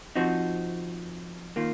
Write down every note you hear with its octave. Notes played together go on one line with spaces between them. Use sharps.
F3 C4 D#4 F#4
D#3 A#3 F4